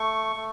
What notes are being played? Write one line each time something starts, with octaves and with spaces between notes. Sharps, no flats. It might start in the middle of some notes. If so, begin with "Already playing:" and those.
Already playing: A3 C#6
A3